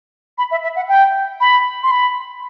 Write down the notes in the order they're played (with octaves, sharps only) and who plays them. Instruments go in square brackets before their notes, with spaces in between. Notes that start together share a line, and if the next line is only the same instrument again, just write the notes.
[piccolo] B5
E5
E5
F#5
G5
B5
C6
B5